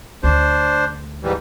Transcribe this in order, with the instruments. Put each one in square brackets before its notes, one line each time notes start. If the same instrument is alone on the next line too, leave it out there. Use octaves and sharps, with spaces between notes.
[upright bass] D2 [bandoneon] D4 C5
[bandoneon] G#2 E3 G3